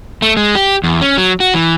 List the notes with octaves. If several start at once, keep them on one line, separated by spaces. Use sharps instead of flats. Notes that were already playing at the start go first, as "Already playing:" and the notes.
A3
G#3
G4
E2
C#4
F#3
F#4
E3